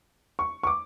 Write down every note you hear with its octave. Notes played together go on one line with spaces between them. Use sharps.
C#6
C#6
D6